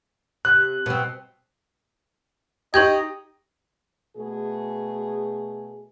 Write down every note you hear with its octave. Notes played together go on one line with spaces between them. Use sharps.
C3 F#6
B2 C4
D#4 G4 D#5 C#6 G6 G#6
B2 A3 G#4